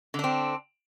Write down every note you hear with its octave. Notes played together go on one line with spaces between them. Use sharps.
D3 C4 D4